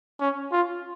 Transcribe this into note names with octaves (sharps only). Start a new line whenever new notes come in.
C#4
F4